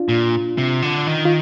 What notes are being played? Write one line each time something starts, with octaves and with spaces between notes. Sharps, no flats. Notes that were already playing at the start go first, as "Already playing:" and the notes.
Already playing: D4 F4
A#2
C3
D3
D#3
F4